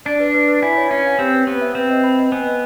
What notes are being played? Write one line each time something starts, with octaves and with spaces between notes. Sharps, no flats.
D4 D5
B4
B4
B4
E4 G#5
C#5
C#4 C#5
F5
C4 G4
B4
B3 G4
E5
C4 B4
D#5
B5
D#5
B3 G#5
D#5